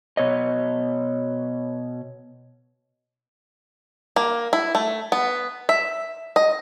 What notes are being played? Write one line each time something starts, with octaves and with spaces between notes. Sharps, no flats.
B2 C#5 D#5
A#3
E4
A3
B3
E5
D#5